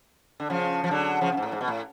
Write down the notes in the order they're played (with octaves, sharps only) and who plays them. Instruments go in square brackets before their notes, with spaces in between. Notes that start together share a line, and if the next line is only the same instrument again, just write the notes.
[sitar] D3
C#3 F3
F3
D3 F#3
C#3 F3
C#3
G#2
A2
G#2
B2
A2